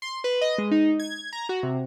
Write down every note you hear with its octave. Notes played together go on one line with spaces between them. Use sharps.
C6
B4
D#5
G#3
D#4
G#6
A#5
F#4
C3